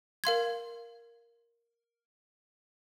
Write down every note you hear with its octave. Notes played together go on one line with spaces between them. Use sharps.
A#4 F5 C6 G#6